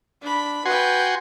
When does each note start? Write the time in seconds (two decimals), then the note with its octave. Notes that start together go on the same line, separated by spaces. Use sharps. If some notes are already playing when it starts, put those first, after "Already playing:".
0.22 D4 B5
0.66 F#4 B4 G5 G#5 C6